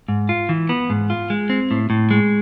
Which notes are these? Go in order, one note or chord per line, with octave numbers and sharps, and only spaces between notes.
G#2
F4
E3
B3
G#2
F4
G#3
C4
A2
A2
G#3